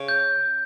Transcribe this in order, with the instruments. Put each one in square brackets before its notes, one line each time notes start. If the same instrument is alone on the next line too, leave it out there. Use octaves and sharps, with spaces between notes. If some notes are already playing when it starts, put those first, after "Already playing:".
Already playing: [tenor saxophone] C#3
[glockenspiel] G6